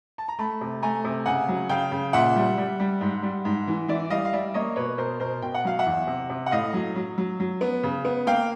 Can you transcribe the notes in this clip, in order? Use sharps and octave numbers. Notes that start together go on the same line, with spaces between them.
A5
A#5
A3 A5 B5
C3
A3 G#5 A#5
C3
C#3 F#5 G#5
F#3
C#3 F5 G5
C#3
A#2 E5 F#5
G3
G3
G3
G#2
G3
G#2
E3
E3 D5 E5
G3 D#5 F5
F5
G3 D5 E5
A#3 C#5 D#5
B2 B4 C#5
B2 A#4 C5
B2 A#4 C5
B2 G5
F#5
F#3 F5
E5 F#5
E2
C3
C3
F#5
A2 D#5 F5
F#3
F#3
F#3
F#3
B3
C#3
B3
A#3 F5 G5